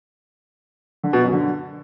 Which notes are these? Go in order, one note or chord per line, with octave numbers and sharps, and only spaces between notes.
D3
B2
F#2
D3